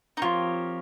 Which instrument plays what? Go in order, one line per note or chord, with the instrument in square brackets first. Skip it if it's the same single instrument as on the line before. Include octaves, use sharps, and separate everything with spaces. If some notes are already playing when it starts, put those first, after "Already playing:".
[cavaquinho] D#4
[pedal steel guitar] F3 C4 G4 A#4 C#5 [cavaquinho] F4